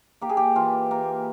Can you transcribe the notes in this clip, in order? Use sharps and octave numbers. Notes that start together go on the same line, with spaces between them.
A#3 G4
G#4
G4
E3 F4
A#3